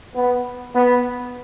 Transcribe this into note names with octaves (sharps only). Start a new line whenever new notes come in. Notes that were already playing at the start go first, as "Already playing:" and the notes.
B3
B3